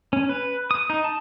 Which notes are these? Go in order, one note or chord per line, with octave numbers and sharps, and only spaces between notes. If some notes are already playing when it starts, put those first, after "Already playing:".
C#4
B4
D#6
D#4
A5